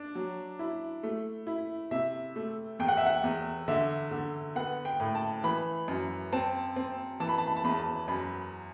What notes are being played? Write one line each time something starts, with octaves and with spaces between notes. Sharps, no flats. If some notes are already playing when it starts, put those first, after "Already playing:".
Already playing: D4
F#3
E4
A3
E4
C3 E5
A3
E2 G5
F#5
E5
F#5
E2
D3 E5
D3
B3 F#5
G5
A2
A5
E3 B5
F#2
C4 A5
C4
E3 A5
B5
A5
B5
A5
E2 B5
A5
F#2 B5